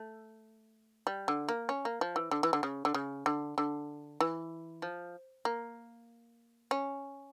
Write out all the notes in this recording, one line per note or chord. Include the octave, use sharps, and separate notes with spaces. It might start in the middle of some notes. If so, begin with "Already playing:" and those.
Already playing: A3
G3
D3
A#3
C#4
A#3
F3
E3
D3
E3
D3
C#3
D3
C#3
D3
D3
E3
F3
A#3
C#4